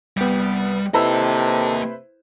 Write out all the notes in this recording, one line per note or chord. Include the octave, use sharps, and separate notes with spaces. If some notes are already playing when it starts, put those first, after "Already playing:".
C2 G3 B3
C3 A#3 E4 A4 B4 C5 D#5